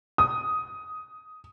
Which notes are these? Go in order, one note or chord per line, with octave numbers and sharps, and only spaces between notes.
D#6